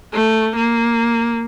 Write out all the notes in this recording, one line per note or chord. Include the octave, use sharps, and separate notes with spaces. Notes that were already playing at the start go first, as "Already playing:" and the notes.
A3
A#3